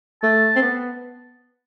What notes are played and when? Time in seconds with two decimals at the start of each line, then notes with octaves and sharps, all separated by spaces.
0.23 A3 A5
0.56 C4
0.62 B3